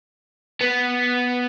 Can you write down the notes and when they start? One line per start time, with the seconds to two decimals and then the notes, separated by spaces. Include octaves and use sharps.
0.61 B3